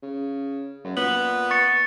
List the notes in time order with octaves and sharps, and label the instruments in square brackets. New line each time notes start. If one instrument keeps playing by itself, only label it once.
[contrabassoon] C#3
F#2
[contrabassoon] A#2 [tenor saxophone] B3 [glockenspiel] F#7
[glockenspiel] C#6 A6 C#7